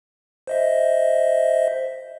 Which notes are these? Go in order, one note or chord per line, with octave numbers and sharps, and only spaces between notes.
C5 D#5 E5